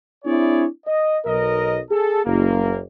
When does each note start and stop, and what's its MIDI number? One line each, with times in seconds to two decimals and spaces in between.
0.25 0.66 60
0.25 0.66 62
0.25 0.66 64
0.25 0.66 68
0.25 0.66 73
0.25 0.66 74
0.86 1.18 75
1.25 1.79 35
1.25 1.79 70
1.25 1.79 75
1.90 2.21 68
1.90 2.21 69
2.25 2.80 30
2.25 2.80 58